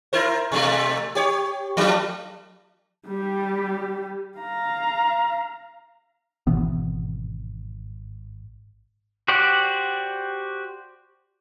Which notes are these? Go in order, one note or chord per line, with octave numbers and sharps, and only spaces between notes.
E4 A#4 C5
B2 G3 A3
G4 C#5
F3 A3 D4
G3 G4
F5 A#5
G#1 B2 E3 B3
F#4 G4 C5 D5 F#5